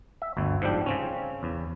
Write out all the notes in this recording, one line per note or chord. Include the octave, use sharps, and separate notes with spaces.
E5
G1 D2
G#2 F3 G3 D4 G5
C#3 C4 C#4
E2